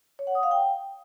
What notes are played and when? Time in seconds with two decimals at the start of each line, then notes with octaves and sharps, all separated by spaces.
0.19 C#5
0.27 F#5
0.35 D#6
0.43 F5
0.51 G5